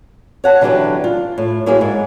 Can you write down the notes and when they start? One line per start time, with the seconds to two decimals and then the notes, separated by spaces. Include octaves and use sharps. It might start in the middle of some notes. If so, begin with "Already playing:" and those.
0.44 C#5 F#5 A5
0.61 D3 E3 F#3 D4 G4 B4
1.04 F4
1.38 A2
1.66 F#3 A#3 E4 G4 G#4
1.81 G#2